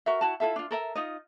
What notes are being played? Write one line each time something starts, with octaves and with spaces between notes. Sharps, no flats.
F#4 A#4 E5
E4 F#4 A5
E4 F4 A4 E5
D4 F4
A4 A#4 E5
D#4 F4 D#5